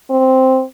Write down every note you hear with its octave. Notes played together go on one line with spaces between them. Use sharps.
C4